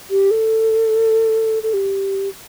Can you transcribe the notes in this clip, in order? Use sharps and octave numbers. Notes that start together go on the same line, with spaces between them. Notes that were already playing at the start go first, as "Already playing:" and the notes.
G4
A4
A4
G4